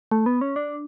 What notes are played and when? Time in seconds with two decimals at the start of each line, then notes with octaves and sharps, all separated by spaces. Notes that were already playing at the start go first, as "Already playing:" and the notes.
0.11 A3
0.26 B3
0.41 C#4
0.56 D4